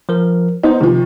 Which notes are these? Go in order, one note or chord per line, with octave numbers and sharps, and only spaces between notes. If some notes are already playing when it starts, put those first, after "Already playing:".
F3 A#4
B3 D#4 C5
C3 D#3 F3